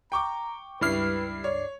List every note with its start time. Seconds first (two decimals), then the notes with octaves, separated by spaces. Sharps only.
0.12 G5 A#5 C#6 D6
0.81 C#2 G2 G3 E4 B4 F6 C7
1.44 C#5 D5